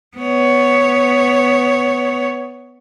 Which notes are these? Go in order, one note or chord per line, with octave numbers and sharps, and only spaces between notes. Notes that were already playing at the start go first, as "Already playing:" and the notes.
B3 C#5